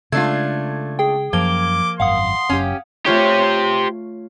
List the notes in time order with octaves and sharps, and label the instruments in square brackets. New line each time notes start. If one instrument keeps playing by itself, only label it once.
[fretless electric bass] C#3 G#3 [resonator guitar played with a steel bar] A3 D4 F4 [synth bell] G#6
[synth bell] G#4 G5
[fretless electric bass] F#2 [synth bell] F3 G#6 G7 [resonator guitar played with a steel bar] A#3 [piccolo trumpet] D6
[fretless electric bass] G#1 F#2 [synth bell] F5 F#5 D#6 [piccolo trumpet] C6
[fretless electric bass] F#1 F#2 [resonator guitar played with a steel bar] C#4 G4
[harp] A3 F4 C#5 [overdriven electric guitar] G4 C5